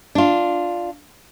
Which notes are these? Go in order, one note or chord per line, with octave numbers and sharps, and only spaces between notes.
D4 F4